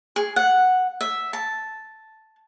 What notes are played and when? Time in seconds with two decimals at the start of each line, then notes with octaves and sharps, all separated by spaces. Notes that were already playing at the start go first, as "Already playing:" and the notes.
0.16 G#4
0.36 F#5
1.01 E5
1.33 A5